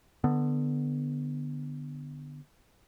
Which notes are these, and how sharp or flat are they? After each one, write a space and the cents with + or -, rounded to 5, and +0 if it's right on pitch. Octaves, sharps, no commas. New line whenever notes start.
D3 +10 B3 +0